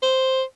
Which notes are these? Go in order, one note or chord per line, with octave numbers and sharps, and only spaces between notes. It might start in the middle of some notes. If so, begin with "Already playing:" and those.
C5